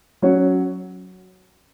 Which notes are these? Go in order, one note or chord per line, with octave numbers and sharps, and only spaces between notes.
F#3 C#4 F#4 C#5